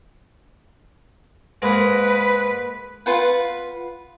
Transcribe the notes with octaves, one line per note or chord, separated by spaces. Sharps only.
G#2 G#3 A#3 B4
F4 B4 F#5